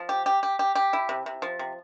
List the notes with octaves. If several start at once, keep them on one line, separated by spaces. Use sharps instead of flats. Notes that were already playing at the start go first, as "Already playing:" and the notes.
Already playing: F3
G4
G4
G4
G4
G4
E4
C3
C3
F3
C3